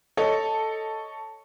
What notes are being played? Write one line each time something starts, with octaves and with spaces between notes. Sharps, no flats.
A4 C#5 D#5